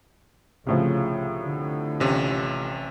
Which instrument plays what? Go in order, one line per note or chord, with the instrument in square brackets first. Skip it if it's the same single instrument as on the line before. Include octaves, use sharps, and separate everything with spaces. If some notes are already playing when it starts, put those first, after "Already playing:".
[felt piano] C2 A2 F3 [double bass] C#3
[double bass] D3
[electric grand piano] A1 C3 C#4